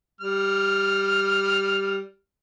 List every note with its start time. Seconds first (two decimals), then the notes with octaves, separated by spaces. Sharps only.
0.21 G3 F6